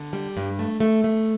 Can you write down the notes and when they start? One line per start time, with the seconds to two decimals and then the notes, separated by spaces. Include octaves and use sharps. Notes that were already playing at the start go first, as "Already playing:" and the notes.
Already playing: D3
0.13 G3
0.37 G2
0.59 A3
0.80 A3
1.04 A3